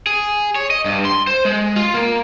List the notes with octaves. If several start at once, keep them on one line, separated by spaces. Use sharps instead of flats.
G#4
C#5
D#5
G2
C6
C5
G#3
F4
A#3